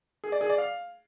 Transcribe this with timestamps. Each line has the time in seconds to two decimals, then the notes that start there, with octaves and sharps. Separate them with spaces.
0.24 G#4
0.32 D5
0.41 G#4
0.50 D5
0.58 F5